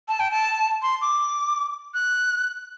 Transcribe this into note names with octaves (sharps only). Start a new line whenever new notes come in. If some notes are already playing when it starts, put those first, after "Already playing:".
A5
G5
A5
C6
D6
F#6